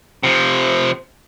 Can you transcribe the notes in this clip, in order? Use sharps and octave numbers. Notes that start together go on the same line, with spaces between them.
C3 F3